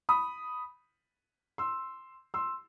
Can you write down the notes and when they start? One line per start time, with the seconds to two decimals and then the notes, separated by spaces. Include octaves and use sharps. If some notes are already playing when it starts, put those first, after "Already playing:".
0.09 B5 D#6
1.58 C6 E6
2.34 C6 E6